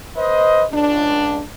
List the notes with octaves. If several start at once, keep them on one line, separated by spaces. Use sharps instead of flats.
B4 C5 D#5
C#2 D4